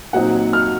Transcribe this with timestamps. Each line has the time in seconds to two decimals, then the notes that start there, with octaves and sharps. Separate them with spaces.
0.13 A#2 F#3 C4 D#4 F#5
0.53 F6